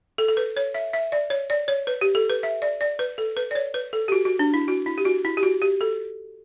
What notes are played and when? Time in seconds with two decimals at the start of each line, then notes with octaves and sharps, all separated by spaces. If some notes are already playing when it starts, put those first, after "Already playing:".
0.18 A4
0.28 A4
0.37 B4
0.57 C#5
0.74 E5
0.93 E5
1.12 D5
1.30 C#5
1.50 D5
1.68 C#5
1.87 B4
2.01 G4
2.15 A4
2.30 B4
2.43 E5
2.62 D5
2.81 D5
2.99 B4
3.18 A4
3.36 B4
3.51 D5
3.55 C#5
3.74 B4
3.93 A4
4.08 G4
4.12 F#4
4.25 F#4
4.39 D4
4.54 E4
4.68 F#4
4.86 E4
4.98 G4
5.05 F#4
5.25 E4
5.37 G4
5.43 F#4
5.62 G4
5.81 A4